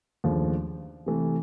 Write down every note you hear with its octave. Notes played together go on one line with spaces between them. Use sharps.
D#2 C#3 F3 A3 D4
C3 E3 A3